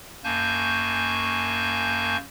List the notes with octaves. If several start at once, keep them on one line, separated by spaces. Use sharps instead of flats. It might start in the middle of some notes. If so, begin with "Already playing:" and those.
F#2 A#3 G#5 A5 C#6 G6